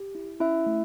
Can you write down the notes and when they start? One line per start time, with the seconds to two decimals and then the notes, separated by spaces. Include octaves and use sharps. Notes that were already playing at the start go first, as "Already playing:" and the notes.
Already playing: G4
0.15 E4
0.40 C#4 E4 E5
0.66 A3